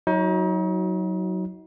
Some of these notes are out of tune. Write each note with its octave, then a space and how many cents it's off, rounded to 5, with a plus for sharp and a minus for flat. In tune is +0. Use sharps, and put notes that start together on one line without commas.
F#3 +0 D#4 +35 F#4 +10